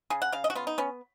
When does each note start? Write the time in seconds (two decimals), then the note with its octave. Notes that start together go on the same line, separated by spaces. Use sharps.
0.10 C#3 G#4
0.22 F#5
0.32 C#3 F5
0.44 D#5
0.50 F#4
0.55 B3 F4
0.67 D#4
0.78 B3 C#4